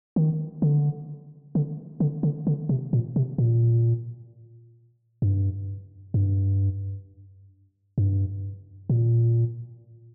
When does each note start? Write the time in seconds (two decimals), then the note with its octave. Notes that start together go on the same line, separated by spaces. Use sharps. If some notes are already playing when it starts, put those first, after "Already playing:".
0.16 D#3
0.62 D3
1.55 D3
2.00 D3
2.23 D3
2.47 D3
2.69 C3
2.93 A#2
3.16 C3
3.38 A#2
5.22 G2
6.14 G2
7.98 G2
8.90 A#2